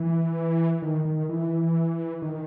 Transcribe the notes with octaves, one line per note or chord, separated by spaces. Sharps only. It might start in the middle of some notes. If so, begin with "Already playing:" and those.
Already playing: E3
D#3
D#3
E3
D#3